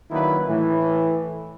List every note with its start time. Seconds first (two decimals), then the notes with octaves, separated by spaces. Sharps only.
0.11 D#3 F#3 A#3 D4 E4 B4
0.47 A2 E3